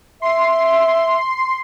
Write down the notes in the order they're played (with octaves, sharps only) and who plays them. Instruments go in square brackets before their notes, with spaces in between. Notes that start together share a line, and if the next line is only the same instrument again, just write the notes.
[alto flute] E5 [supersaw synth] C6